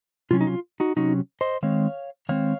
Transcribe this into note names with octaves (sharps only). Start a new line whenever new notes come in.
C3 F#3 C#4 F4
D#4
F4
D#4 F#4
C3 F#3 C#4 D#4 F#4
C5 D#5
D#3 G#3 C4 C#5 F5
D#3 G#3 C4 C#5 F5